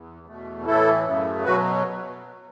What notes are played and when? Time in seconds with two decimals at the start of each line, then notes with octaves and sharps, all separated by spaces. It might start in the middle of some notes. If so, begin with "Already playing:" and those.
Already playing: E2
0.27 E2 B2 A3
0.66 A2 E3 A3 E4 A4
1.05 F#2 C#3 A3
1.44 B2 F#3 F#4 B4